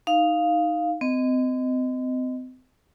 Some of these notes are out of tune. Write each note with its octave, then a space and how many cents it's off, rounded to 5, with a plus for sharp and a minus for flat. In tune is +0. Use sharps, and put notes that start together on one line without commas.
D#4 +0 F5 +0
C4 -35 D#5 +0